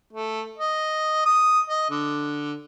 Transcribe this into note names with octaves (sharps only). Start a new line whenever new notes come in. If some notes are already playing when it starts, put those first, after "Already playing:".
A3
D#5
D#6
D#5
D3